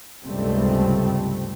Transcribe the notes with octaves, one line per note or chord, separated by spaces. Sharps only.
C#2 G2 C3 G3 A3 C4